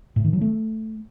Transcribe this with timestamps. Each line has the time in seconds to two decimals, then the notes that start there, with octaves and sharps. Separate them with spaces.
0.16 A2
0.24 D#3
0.33 F#3
0.41 A3